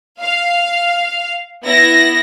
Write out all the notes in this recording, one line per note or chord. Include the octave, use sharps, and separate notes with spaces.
F5
B3 E4 A#6